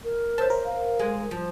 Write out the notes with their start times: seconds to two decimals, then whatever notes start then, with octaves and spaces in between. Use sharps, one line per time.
0.04 A#4
0.38 C5 E5 A5
0.50 A#4
0.65 F5
0.99 G#3
1.31 F3